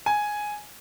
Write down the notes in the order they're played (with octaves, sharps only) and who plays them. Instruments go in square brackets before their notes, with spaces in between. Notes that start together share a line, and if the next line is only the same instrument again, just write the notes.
[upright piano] G#5